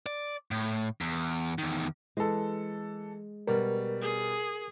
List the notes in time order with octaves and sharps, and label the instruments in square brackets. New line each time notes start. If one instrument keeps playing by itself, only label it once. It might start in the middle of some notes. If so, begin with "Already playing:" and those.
[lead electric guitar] D5
A2
E2
E2 D#3
[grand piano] E3 A4 [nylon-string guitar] G#3
[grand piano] B2 G3 [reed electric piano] A#4
[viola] G#4